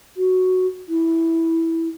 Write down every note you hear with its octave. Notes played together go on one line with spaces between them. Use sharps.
F#4
E4